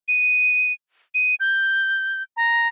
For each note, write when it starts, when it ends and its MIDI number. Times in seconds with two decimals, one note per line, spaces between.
0.08 0.73 99
1.14 1.35 99
1.40 2.23 91
2.37 2.68 82